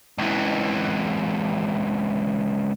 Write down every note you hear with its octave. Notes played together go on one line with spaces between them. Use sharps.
C#2 E3